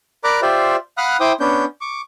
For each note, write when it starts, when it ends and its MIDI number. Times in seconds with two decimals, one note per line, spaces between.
0.24 0.40 70
0.24 0.40 74
0.24 0.40 82
0.24 0.40 83
0.24 0.40 86
0.24 0.40 90
0.42 0.76 65
0.42 0.76 67
0.42 0.76 72
0.42 0.76 74
0.42 0.76 76
0.98 1.17 77
0.98 1.17 78
0.98 1.17 83
0.98 1.17 87
0.98 1.17 89
0.98 1.17 90
1.20 1.32 64
1.20 1.32 72
1.20 1.32 79
1.20 1.32 86
1.20 1.32 87
1.40 1.65 59
1.40 1.65 61
1.40 1.65 62
1.40 1.65 91
1.81 2.01 85
1.81 2.01 86